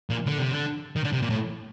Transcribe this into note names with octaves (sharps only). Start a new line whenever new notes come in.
A#2
D3
C3
D3
D#3
D3
C3
A#2
A2